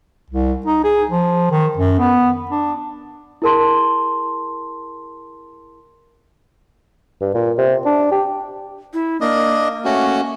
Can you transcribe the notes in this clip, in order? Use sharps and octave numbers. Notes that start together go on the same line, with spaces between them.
C2
D#4
G#4
F3
D#3
F#2
B3
D4
E4 G#4 A#4 A5 C6
G2
A#2
C3
D4
G4
E4
A#3 D4 D#5
A3 C#4 F#4